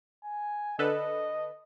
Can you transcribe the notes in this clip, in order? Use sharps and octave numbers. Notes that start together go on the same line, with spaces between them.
G#5
D3 A4 B4 D#5